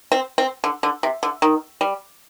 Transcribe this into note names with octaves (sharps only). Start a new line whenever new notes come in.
C4
C4
D3
D3
C3
D3
D#3
G3